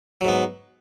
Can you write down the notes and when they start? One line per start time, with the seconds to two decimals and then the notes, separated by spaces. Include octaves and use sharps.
0.21 F#3
0.25 G#2
0.28 B3